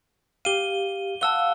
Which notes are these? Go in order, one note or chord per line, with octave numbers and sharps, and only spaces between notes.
G4 F5 D#7 G7
F5 F#5 A5 E6 G7